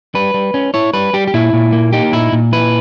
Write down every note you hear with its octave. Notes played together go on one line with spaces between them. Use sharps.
G3 B4
G3
C#4
E4 C#5
G3 B4
G3 G4
G4
A#2 E4
A#2
A#3
D#4 G4
A#2 E4
A#2
E4 B4